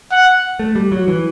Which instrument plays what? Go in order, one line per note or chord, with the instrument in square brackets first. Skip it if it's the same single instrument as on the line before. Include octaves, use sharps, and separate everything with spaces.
[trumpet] F#5
[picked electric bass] A3
G3
F#3
E3